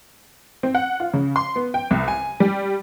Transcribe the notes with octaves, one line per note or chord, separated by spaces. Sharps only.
C4
F#5
F4
C#3
C6
B3
G5
C2
G#5
G3